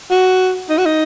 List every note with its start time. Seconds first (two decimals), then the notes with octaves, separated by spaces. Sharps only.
0.11 F#4
0.69 D#4
0.78 F#4
0.85 D#4